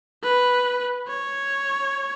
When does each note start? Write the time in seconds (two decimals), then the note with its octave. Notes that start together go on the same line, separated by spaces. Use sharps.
0.23 B4
1.07 C#5